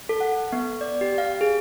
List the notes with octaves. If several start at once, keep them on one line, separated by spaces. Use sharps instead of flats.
A4
F#5
B3
D5
G4
F5
G#4